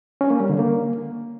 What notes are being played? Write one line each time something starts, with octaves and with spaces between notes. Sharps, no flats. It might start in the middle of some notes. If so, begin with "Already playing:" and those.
C#4
A#3
G3
D3
A#3